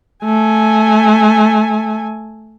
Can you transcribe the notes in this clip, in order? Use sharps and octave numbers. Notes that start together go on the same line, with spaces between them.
A3 G#5